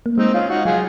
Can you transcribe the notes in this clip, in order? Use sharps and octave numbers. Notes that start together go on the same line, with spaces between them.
A#3
G#3 C4 D#4
C#4 F4
D#4 F#4
F#3 F4 G#4